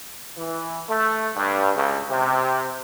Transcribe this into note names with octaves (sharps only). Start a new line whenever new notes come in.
E3
A3
G2
C#2
C3